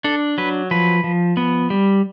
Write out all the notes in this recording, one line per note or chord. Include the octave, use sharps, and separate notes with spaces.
D4 A4
F#3 B4
F3 B4
F3
B3
G3